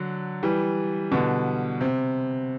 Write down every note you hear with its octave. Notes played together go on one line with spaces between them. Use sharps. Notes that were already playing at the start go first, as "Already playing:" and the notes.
Already playing: D3 F#3
E3 G3
B2 D3
C3